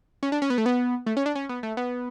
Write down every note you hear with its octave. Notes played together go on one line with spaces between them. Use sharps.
C#4
D4
C#4
B3
A3
B3
A3
C#4
D4
C#4
B3
A3
B3